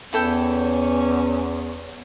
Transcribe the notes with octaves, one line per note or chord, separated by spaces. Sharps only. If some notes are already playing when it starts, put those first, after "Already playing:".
E2 B3 C#4 E4 A4 G5